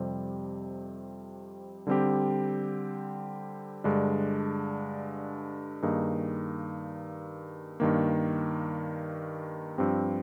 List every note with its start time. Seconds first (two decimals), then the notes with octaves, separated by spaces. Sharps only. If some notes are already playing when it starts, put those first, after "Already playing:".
Already playing: F2 C3 G3 C4
1.87 D3 G3 C4 G4
3.84 G2 D3 G#3 D4
5.83 G2 D#3 A#3 D#4 G#4
7.80 G2 D#3 A#3
9.78 G2 F3 C4 G4